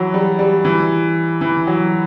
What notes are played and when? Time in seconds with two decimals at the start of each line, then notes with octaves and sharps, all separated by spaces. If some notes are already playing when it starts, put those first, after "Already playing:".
Already playing: E3 F#3
0.14 G3
0.39 G3
0.65 E3
1.41 E3
1.67 F#3